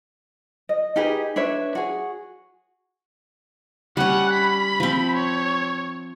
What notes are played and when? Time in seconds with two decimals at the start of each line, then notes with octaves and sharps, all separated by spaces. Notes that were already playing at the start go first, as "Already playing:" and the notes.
0.69 D#5
0.96 D#4 G4 G#4 B4
1.36 D4 B4 C#5 E5
1.75 F#4 G#4
3.97 G3 C#4 F#5
4.33 B5
4.80 F3 C4
5.16 C#5